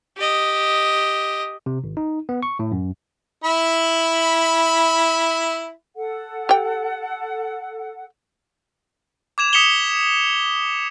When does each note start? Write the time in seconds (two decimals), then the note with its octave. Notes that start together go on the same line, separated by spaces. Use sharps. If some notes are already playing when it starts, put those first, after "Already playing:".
0.18 G4 D#5
1.66 C3
1.84 G#1
1.97 D#4
2.29 B3
2.43 C#6
2.59 A2
2.72 F#2
3.44 E4 B5
5.96 A4 F#5
6.49 G4 G5
9.38 D6 G#6 E7 F7
9.53 D#6 B6 C#7 E7 F7 G7